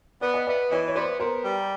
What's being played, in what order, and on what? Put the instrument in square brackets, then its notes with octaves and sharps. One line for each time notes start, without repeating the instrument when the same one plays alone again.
[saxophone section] B3 [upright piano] D5
[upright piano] D#5
[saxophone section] B3 [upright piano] D5 E5
[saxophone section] E3 [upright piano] C#5 D#5
[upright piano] C#5
[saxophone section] B3 [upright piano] C5 D5
[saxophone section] B3 [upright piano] A#4 C5
[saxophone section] G3